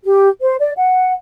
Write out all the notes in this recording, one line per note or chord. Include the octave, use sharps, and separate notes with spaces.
G4
C5
D5
F#5